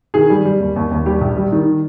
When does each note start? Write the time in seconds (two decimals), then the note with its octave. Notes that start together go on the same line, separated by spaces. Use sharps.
0.14 D#3 G#4
0.30 G3
0.45 G3
0.60 D#2
0.76 D#2
0.91 D#2
1.06 G3 G4
1.21 A#1
1.37 G3
1.52 D#3